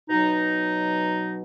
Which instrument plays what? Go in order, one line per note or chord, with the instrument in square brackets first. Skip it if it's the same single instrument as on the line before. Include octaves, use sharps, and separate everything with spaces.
[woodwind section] B2 F#3 D#4